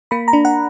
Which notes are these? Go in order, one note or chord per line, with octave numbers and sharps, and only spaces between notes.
A#3 B5
A#5
D4
F#5